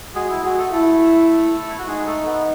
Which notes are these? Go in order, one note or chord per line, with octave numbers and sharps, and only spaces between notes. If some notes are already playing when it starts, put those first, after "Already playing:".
G#3 F#4 G#4
E4
G#3 F#4 G#4
A3 A4
A3 E4 A4
E4
F#4
G#3 D#4 G#4
A3 A4
B3